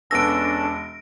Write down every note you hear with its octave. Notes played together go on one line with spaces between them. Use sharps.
E1 B3 C#4 D4 A4 E6 A#6 D7